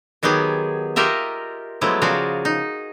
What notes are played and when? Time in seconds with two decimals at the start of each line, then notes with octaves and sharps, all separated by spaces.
0.23 D#3 F#3 B3 G4 G#4
0.96 F4 G4 A#4 D#5 E5
1.81 F3 F#3 G#3 A3 B3 E4
2.02 C#3 F3 F#4 G#4 A#4 D5
2.45 D#4